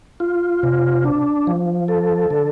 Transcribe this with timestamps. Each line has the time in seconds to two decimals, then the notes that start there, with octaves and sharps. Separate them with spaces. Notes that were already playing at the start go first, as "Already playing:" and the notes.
0.20 F4
0.63 C3
1.04 D4
1.47 F3
1.88 A4
2.30 D3